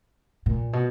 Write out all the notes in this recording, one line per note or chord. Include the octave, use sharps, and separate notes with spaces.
A#2
B2